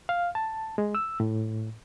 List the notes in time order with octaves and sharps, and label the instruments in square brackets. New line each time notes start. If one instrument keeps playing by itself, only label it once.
[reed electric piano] F5
A5
G#3
E6
A2